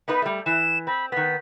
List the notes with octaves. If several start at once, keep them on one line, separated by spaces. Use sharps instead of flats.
B3 D#4 B4
G3 A3
E3 E7
C4 B5
D#3 B3 B6